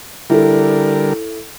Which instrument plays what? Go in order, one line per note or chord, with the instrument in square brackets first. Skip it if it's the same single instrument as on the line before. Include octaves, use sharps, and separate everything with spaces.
[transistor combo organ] D3 G3 A#4 [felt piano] E4 A4